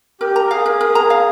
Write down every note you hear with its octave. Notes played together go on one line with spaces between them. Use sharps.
G4 A#4
A#5
A#4
G#4 F5
A#4
A#4
A#5
F5